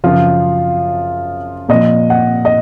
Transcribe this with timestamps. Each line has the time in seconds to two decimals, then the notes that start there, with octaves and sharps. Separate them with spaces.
0.04 F#2 C#3 F3 F4
1.69 A#2 F3 D#5
2.10 F#5
2.45 D#5